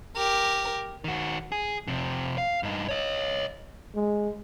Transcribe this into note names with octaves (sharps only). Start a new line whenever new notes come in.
G4 A#4
D#3 F#4
G#4
F2 C3
F5
G2 D#4
C#5 D#5
G#3